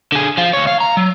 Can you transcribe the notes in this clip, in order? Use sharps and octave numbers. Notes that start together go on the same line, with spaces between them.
D3 G#4
F3 F4
D2 C#5
F5
A#5
F#3